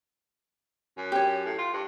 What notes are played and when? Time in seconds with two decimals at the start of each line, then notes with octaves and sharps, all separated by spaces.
0.97 F#2
1.12 G4 C#5
1.45 A2
1.58 F4
1.73 G2